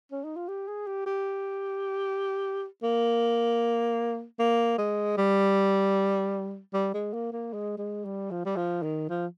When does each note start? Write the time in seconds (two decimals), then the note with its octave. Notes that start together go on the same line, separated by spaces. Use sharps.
0.12 C#4
0.24 D#4
0.36 F4
0.48 G4
0.68 G#4
0.87 G4
1.06 G4
2.83 A#3
4.39 A#3
4.78 G#3
5.17 G3
6.73 G3
6.94 G#3
7.13 A#3
7.32 A#3
7.53 G#3
7.78 G#3
8.05 G3
8.31 F3
8.45 G3
8.56 F3
8.83 D#3
9.09 F3